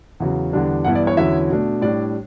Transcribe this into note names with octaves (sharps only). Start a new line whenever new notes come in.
E2 C#3 F#3
E2 D3 G3 D4
G2 E3 B3 E4 F#5
D5
C#5
E2 D3 F#3 C#4 E4 E5
B2 A3 D4
A2 G3 D4 D5